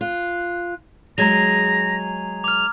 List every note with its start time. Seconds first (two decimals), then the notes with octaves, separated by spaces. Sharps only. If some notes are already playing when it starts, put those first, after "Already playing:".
0.01 F4 F#6
1.18 F#3 G#3 G#4 A#5 G#6 A#6 F7
2.44 D6 F6 F7